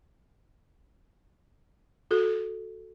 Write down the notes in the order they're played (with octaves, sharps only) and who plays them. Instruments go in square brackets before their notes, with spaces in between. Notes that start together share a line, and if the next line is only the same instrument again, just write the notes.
[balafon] F#4 A4